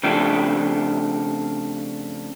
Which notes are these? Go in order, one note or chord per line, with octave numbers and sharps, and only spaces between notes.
C#3 F3 A3 C4 D4 G4